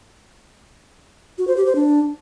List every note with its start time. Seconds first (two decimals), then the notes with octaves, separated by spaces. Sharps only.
1.38 F#4
1.47 C5
1.57 G4
1.66 C5
1.75 D4